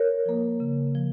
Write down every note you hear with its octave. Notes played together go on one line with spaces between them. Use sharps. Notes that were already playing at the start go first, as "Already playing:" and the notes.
Already playing: A#4 C#5
F3 A#3
C#3
F3